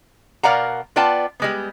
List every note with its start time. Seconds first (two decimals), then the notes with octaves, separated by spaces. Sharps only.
0.43 B2 A#4 D5 F5 F#5 A#5
0.96 B3 F4 D5 G5 A5
1.40 G3 G#3 B3